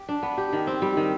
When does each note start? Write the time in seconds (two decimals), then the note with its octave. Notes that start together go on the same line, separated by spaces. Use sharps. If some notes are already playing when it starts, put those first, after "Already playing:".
Already playing: G4
0.09 D4
0.23 B3
0.38 G4
0.53 D#3
0.67 C4
0.82 G3
0.97 D#3